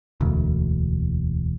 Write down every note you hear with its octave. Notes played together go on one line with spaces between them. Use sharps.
E1 D2